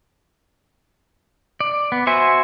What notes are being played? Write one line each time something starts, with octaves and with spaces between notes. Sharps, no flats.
D5
B3
F#4 C5 E5 G#5